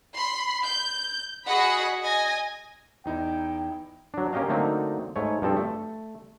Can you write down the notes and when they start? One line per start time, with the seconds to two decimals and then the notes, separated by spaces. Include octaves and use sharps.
0.14 B5 C6
0.64 G6
1.45 F#4 G#4 D#5 F#5 B5
2.04 D#5 G#5 A#6
3.05 E2 D#4 E4 G5
4.14 F#3 D4
4.33 A#3 C#4 G4 D#5 F5
4.48 D3 F#3 A3 A#3 C4 D#4
5.16 G#2 A3 C#5
5.42 G2 F3 C4 A4
5.56 A3